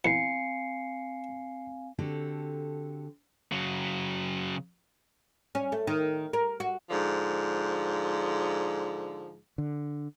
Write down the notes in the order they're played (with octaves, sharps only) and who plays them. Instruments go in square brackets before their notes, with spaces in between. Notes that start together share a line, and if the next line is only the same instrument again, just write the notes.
[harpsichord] E2 [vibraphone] C4 F5 G#5 [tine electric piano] C7 C#7
[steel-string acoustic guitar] D3 C4 F#4 G4 A4
[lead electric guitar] C#3 F#3
[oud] C#4
A3
D#3
A#4
F#4
[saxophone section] G#2 D3 F3
[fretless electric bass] D3